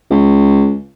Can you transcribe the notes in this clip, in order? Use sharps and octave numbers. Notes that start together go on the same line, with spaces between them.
C#2